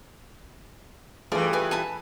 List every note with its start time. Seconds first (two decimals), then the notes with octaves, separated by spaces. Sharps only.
1.32 G2 E3 A3 F4 G#4 D5
1.53 B4 G#5
1.71 G#5 A5 B5